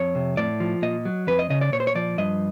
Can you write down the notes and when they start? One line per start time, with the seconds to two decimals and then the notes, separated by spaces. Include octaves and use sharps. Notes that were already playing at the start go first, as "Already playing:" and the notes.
Already playing: F2 C#5
0.15 C3
0.37 A2 D5
0.60 F3
0.82 A#2 D#5
1.05 F#3
1.27 F2 B4
1.39 D#5
1.50 C#3 D#5
1.61 D5
1.72 A#2 C#5
1.80 C5
1.87 C#5
1.95 F3 D5
2.18 G2 D#5